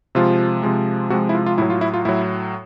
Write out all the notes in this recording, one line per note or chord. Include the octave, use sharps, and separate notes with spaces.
C3 F3 G#3 F4
C3 F3 G#3
C3 F3 G#3 F#4
E4
F4
F4
A2 F#3 E4
F4
E4
F4
A2 F#3 E4